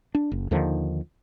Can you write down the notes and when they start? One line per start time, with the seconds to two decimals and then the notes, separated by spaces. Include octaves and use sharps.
0.15 D4
0.32 F#1
0.51 D#2 D3 D#3 F3